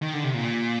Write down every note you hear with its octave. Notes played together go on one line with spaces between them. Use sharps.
D#3
D3
C3
A#2